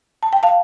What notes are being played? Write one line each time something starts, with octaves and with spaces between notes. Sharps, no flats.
A5
G5
F5 A5